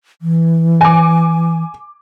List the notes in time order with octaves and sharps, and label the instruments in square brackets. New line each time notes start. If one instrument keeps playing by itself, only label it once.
[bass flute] E3
[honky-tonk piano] G#5 D6